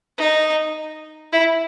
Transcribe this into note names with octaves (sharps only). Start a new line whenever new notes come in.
D#4
E4